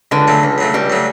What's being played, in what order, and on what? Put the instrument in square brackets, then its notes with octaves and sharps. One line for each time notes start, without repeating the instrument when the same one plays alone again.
[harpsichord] C#2 [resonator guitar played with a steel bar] D3
[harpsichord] C#3 F#3 A3
C#2
C#3 F#3 A3
[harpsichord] C#2 [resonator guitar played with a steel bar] G3
[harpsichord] C#3 F#3 A3